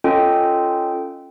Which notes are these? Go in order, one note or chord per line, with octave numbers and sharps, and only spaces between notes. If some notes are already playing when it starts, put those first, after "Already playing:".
C#4 F4 A4 D#5 G5